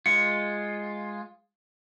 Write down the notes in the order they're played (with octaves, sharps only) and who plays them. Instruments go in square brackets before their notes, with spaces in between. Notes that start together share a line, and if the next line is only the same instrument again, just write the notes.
[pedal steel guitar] G#3 F4 [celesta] C#7